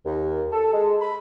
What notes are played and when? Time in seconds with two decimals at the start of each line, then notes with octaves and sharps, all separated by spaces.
0.06 D#2
0.52 A4
0.73 G#3
1.01 B5